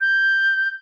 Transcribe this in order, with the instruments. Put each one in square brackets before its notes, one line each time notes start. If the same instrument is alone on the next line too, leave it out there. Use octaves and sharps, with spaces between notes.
[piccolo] G6